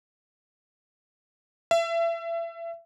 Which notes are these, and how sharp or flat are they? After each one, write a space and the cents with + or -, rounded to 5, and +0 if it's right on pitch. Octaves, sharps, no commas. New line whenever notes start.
E5 +30